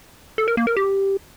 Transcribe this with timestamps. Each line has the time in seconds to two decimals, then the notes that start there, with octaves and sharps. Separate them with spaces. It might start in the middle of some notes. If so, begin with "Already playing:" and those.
0.38 A4
0.48 A#4
0.57 A#3
0.67 A#4
0.77 G4